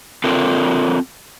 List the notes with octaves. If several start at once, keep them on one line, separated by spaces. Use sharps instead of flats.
C4 D4 F4 A4 A#4